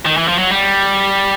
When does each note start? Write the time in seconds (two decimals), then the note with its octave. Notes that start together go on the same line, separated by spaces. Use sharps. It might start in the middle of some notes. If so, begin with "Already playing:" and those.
0.06 D#3
0.17 E3
0.28 F3
0.38 F#3
0.50 G3